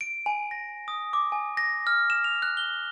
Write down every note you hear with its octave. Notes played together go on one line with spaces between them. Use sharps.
D7
G#5
A#6
D#6
D6
G#5
A#6
F6
E7
F7
F#6
G7